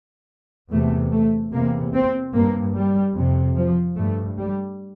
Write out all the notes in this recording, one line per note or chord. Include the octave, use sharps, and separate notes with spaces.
E2 C3 A3
A3
E2 C3 A#3
C4
G2 A#3
G3
F2 C3
F3
G2 A3
G3